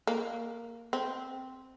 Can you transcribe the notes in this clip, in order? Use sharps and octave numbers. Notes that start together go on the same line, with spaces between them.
A#3
C4